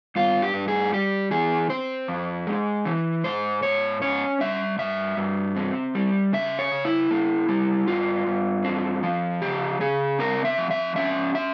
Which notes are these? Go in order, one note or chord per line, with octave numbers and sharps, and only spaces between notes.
G2 F4
G4
G2
G#4
G3 G4
E3 G#4
C4 C5
F2
G#3
E3
G#2 C5
G#2 C#5
C#4 C#5
G3 E5
G2 E5
G2
C4
G3
C#3 E5
C#5
C#3
E4
A#3
G3
G2 F4
G2
C4
F3
C#3 G4
C#3 G#4
C4 A#4
E5
F3
E5
C#4 E5
E5